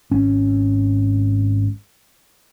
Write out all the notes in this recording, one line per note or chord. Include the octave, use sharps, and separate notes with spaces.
G#1 C#4